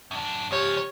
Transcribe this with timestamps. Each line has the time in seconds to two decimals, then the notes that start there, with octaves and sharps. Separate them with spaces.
0.11 F#2 D4
0.51 C#2 F3 G4 C#5